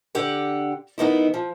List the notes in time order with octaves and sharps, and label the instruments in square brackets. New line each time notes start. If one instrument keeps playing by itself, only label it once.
[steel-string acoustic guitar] D3 G4 F#5 G5
D#3 B3 D#4 E4
F3